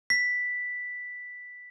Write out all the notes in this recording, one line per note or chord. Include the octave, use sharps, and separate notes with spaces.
B6